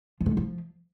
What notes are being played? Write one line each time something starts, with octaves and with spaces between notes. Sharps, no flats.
F3
D3
G#3
F3